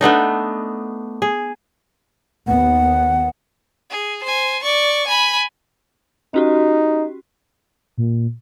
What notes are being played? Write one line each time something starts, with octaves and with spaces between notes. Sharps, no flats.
A3 B3 D4 D#4
G#4
D#2 B3 F#5
G#4
C5 G#5
D5 C#6
G#5 B5
C#4 D#4 F#4 G4
A#2